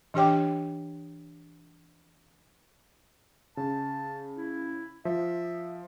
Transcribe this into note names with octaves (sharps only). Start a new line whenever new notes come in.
E3 D4 G4 C#5 G5 D6
C#3 A5
E4
F3 E5